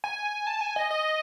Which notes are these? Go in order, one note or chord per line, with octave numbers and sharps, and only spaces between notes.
G#5
A5
G#5
D#5
D#5